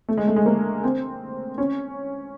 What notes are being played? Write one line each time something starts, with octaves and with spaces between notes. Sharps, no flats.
A3
G#3
A3
G#3
A#3
C4
C#4